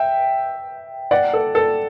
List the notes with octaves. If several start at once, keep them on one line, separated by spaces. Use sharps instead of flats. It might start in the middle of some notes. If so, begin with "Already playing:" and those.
Already playing: E5 G5
D5 F#5
A4
A4